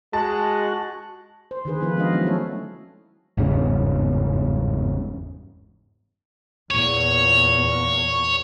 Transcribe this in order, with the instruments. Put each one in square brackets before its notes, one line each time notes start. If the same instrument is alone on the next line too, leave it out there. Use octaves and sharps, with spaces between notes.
[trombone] G#3 [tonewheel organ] F#4 [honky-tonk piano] A5
[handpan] C5
D3 D#3 G#4 B4
F3 B3 E4 F4 B4
G#3 C4 D#4 F#4 D#5 F5
F#3 B3 C#4 E4
A3 E4 A4 C#5
[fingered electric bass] G1 E2 G#2 C#3
[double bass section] E2 A#2 [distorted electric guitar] C#5